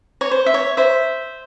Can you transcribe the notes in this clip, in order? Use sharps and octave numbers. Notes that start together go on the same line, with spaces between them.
C#5
C5
E5
C#5
C5 E5